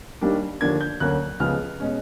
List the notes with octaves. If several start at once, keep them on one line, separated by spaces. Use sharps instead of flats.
D#2 D#3 G3 A#3 D4
D#2 D3 F3 A#3 D4 G#6
G6
D2 D3 F#3 A#3 C#4 F#6
C#2 C#3 F3 G#3 B3 F6
B2 G#3 C#4